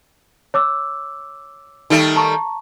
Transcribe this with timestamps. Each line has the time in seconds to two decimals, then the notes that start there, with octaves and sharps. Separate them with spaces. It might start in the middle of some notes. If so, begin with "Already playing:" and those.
0.54 C#5 D6 E6
1.90 D#3 G3 A3 D#4
2.16 A5 A#5 C#6